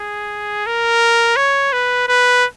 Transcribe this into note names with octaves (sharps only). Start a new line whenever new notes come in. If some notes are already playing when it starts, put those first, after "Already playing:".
Already playing: G#4
A#4
C#5
B4
B4